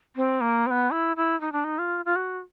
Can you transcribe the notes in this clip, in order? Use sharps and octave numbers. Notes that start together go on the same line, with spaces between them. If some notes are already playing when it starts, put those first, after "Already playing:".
C4
A#3
C4
B3
E4
E4
D#4
D4
D#4
F4
F4
F#4